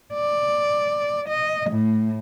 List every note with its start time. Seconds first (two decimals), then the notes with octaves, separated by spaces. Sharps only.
0.14 D5
1.29 D#5
1.71 A2